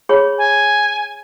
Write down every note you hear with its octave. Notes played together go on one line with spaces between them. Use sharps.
G#4 C#5 B5
G#5